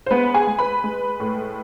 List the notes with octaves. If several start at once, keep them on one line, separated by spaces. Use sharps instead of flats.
C5
G#3 B3 B4
G#4 G#5
G#3
B4 B5
G#3
A2